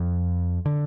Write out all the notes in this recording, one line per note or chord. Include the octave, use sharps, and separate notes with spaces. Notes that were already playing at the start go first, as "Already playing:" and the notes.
Already playing: F2
D3